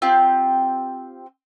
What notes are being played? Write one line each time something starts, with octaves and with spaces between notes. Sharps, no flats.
C4 F4 G4